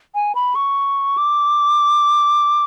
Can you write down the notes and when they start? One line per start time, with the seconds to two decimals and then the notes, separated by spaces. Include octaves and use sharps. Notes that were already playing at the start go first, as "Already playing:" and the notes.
0.15 G#5
0.35 B5
0.55 C#6
1.18 D6